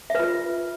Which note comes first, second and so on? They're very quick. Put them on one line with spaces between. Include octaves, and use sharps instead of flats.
E5 B4 F4